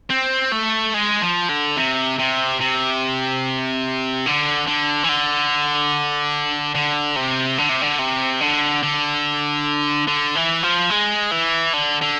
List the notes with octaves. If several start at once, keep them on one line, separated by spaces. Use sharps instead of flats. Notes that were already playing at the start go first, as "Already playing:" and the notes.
C4
A3
G#3
F3
D3
C3
C3
C3
D3
D3
E3
D3
D3
C3
D3
C3
D3
C3
D3
D3
D3
E3
F3
G#3
E3
D3
D3